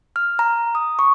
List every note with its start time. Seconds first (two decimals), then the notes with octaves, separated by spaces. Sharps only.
0.16 F6
0.39 A#5
0.75 D#6
0.99 C#6